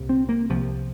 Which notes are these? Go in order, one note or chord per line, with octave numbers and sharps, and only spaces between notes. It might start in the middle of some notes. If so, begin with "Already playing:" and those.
Already playing: C2 A#2
C4
A#3
C2 C3 F3